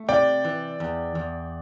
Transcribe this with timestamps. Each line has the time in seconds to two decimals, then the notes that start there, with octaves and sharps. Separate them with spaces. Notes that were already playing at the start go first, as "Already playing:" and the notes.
Already playing: A3
0.08 C3 D5 G5
0.45 E3
0.80 E2
1.15 E2